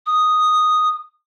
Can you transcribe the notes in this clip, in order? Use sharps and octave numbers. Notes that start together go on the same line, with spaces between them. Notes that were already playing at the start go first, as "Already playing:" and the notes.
D#6